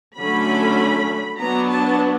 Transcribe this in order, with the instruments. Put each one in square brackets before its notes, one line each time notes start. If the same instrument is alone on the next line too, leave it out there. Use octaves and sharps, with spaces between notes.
[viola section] D3 F#3 A3 C#4 B5
F#3 B3 D4 A#5
A5